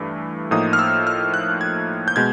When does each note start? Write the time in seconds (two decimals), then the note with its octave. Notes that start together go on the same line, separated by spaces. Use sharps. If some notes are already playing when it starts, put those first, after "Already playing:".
Already playing: G2 E3 A3
0.51 A2 F3 A#3 D#4 D#6
0.73 F6
0.79 E6
1.07 F6
1.34 F#6
1.61 G#6
2.08 G6
2.16 B2 G#3 G#6